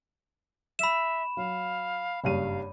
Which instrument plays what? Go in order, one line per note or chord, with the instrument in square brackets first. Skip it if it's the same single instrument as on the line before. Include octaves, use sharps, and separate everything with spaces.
[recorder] E5 [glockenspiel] B5 E7
[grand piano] F#3 [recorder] F5
[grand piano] F#1 G2 D#7 [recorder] F5